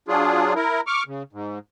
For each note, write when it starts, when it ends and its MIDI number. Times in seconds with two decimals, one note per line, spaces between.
0.08 0.53 54
0.08 0.53 62
0.08 0.53 65
0.08 0.53 68
0.56 0.81 64
0.56 0.81 70
0.87 1.03 85
0.87 1.03 86
0.87 1.03 89
1.07 1.23 49
1.33 1.59 44